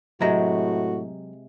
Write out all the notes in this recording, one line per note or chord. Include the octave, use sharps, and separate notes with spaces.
A2 C3 F#3 G#3 F#4 G4 A#5